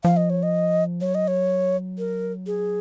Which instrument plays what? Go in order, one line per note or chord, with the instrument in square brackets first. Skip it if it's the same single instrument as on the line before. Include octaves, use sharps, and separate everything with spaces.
[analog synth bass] F3 [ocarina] F5
[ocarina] D#5
C#5
D#5
[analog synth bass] F#3 [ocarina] C#5
[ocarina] D#5
C#5
A#4
G#4